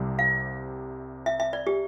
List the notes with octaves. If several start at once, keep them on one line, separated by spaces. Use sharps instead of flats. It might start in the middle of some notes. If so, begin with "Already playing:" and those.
Already playing: C2 C3 G3
F5
E5
E5
D5
G4